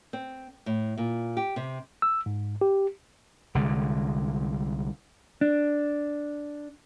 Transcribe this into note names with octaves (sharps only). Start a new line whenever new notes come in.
C4
A2
A#2
G4
C3
E6
G#2
G4
C2 D3 G#3
D4